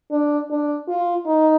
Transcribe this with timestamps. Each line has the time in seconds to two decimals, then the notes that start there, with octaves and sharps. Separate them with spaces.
0.11 D4
0.50 D4
0.88 F4
1.27 D#4